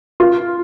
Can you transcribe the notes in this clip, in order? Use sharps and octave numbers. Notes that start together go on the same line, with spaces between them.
F4